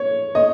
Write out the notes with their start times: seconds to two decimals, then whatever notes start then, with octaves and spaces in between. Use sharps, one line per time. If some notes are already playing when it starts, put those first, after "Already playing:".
Already playing: C#5
0.35 D#5